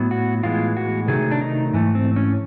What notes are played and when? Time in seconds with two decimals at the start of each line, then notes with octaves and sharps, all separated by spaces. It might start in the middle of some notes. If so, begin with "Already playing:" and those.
Already playing: A2 F#3 B3
0.11 F#4
0.43 A2 E3 G#3 B3 F4
0.77 F#4
1.08 C3 D#3 F#3 A3 G#4
1.31 D4
1.41 D#4
1.73 G#2 E3 A3
1.95 C4
2.16 C#4